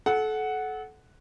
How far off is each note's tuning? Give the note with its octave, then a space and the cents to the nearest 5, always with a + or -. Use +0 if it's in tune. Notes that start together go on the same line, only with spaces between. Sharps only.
A4 -30 F#5 +0